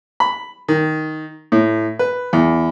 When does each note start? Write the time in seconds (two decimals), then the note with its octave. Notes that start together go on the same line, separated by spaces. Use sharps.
0.20 B5
0.68 D#3
1.52 A2
1.99 B4
2.33 E2